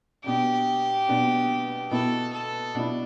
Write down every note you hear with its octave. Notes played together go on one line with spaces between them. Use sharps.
B2 B3 D4 G4
B2 B3 D4
B2 B3 E4 A4
A4
B2 B3 D4 E4